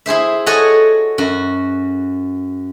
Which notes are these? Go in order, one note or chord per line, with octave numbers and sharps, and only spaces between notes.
E4 G#4 C5 E5
F#4 A4 C#5 D#5 F#5 G#5
F#2 F#4